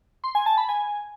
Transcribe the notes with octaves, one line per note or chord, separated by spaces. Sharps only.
C6
G#5
A5
B5
G#5